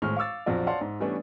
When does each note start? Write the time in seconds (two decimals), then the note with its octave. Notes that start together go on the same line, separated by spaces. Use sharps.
0.02 G#1 A2 G#3 F6
0.16 F5 C#6 D6 E6 A6
0.46 A#1 F2 F#3 F4 F#4 D5
0.67 C#5 D5 F5 F#5 A5 C6
0.81 G#2
1.00 E3 G3 A3 B3 C#4 D4